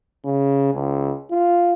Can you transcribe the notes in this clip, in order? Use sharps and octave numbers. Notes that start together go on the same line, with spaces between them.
C#3
C#2
F4